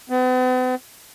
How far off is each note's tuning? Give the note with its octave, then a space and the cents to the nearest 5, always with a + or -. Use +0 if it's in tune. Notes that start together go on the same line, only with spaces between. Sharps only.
B3 +45